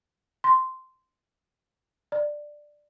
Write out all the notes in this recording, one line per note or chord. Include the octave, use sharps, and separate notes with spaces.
C6
D5